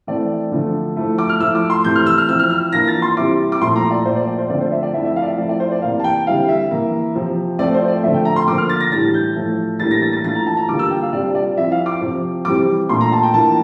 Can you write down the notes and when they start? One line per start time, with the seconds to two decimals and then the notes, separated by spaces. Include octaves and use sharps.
0.07 E3 A3 C4 D5
0.52 D3 F3 A3 D4
0.96 F3 A3 E4
1.18 D6
1.29 F6
1.40 F3 A3 E4 E6
1.55 D6
1.70 C6
1.84 C3 E3 A3 G6
1.95 F6
2.06 E6
2.18 F6
2.29 F3 C4 E4 E6
2.39 F6
2.50 F6
2.73 E3 A#3 D4 F4 A#6
2.87 A6
3.02 C6
3.17 C3 G3 C4 E4 D6
3.52 D6
3.61 A#2 F3 A3 E4 C6
3.76 A#5
3.91 D5
4.05 A#2 F3 A3 C5
4.16 D5
4.28 D5
4.38 C5
4.50 D3 F3 A3 C4 F4 D5
4.61 C5
4.72 E5
4.83 D5
4.94 F3 A3 C4 E4 E5
5.05 E5
5.16 F5
5.22 D5
5.27 E5
5.38 F3 A3 C4 E4 D5
5.49 D5
5.60 C5
5.72 D5
5.82 C3 E3 A#3 F5
6.00 A5
6.04 G5
6.26 D3 G3 C4 E4 F5
6.49 E5
6.71 E3 A#3 E4
7.15 C3 F3 C4
7.59 F3 A3 C4 D5
7.74 C5
7.88 D5
8.03 D3 F3 A3 E5
8.14 G5
8.25 A#5
8.36 C6
8.48 D3 F3 A#3 D6
8.58 F6
8.69 A6
8.80 A#6
8.92 A2 E3 G3 D4 A6
9.14 G6
9.36 A2 F3 A3
9.79 A2 E3 G3 A#3 D4 A6
9.91 A#6
10.02 A6
10.13 A6
10.24 E3 A3 D4 F4 A6
10.35 A#5
10.47 A5
10.57 A#5
10.69 D3 G3 A#3 D4 F4 D6
10.79 E6
10.91 G5
11.02 F5
11.12 C3 G3 D4 F4 D5
11.35 D5
11.57 F3 C4 E4 E5
11.72 F5
11.86 D6
12.01 C3 F3 C4
12.45 C3 E3 G3 C4 D6
12.89 A#2 A3 D4 C6
13.01 A#5
13.12 A5
13.23 G5
13.33 E3 A#3 D4 F4 A5